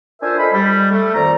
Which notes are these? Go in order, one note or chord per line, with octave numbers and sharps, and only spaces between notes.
D4 F4 A#4 C5 E5 G#5
A4 C5 D#5 B5
G3
A3
F2 D#3 D5 A#5